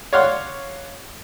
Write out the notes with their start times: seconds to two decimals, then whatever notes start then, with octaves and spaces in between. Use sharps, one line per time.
0.13 C#5 D5 F5 F#5 C6